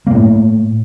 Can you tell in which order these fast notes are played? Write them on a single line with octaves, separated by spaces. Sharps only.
A#3 A2 A3